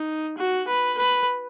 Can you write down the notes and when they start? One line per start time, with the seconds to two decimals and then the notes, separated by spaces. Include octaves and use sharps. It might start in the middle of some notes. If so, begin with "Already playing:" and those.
Already playing: D#4
0.38 F#4
0.68 B4
0.98 B4